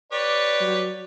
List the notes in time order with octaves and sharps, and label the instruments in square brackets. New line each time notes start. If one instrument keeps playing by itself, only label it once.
[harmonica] G4 B4 C#5 [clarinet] D5
[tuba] F#3